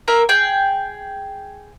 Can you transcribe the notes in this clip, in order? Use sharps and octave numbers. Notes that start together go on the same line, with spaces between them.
A#3 A#4 E5
G#4 G5